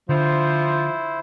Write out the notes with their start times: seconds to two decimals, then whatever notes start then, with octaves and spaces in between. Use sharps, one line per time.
0.09 D3 F3 E4 C5